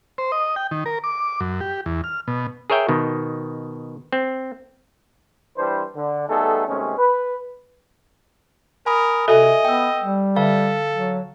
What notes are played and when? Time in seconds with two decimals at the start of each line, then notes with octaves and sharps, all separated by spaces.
0.18 C5
0.32 D#5
0.56 G5
0.71 D#3
0.86 A#4
1.04 D6
1.40 F#2
1.61 G4
1.86 E2
2.04 F6
2.28 B2
2.70 G#4 A#4 C#5 E5 G5
2.89 B2 D#3
4.12 C4
5.58 E3 G3 D4 B4 C5
5.96 D3
6.29 G3 A3 B3 D#4 G#4 A4
6.68 D#2 C3 G#3 A3 C#4
6.98 B4
8.86 A#4 G#5 B5 D#6
9.28 C3 F#4 A4 D#5 E5 G#5
9.65 B3 G5 E6
10.02 G3
10.36 D3 A4 E5 F5
10.94 F#3